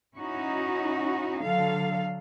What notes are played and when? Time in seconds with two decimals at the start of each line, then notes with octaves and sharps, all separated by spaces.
0.17 C#4 D#4 E4 F#4
1.41 D3 F#3 A4 F5